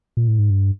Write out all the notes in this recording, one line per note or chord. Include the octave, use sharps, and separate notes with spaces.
A#2
A2
G#2
G2